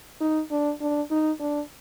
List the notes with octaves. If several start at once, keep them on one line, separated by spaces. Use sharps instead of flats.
D#4
D4
D4
D#4
D4